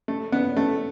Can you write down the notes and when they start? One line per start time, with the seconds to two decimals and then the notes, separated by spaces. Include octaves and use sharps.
0.08 A3
0.32 B3
0.57 A3